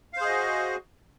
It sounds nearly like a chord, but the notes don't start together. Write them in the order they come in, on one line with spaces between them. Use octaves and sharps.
F5 C5 G#4 D#5 F#4